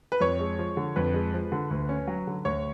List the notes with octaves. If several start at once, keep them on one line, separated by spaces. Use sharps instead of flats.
B4
F2 C#5
G#3
F3
D3
F2 B4
G#3
F3
D3
D2
C#4
F#3
D3
D2 C#5